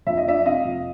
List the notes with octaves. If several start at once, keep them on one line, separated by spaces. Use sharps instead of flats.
F2 E5
D#5
F3 D5 E5
C3 D#5 F5
F2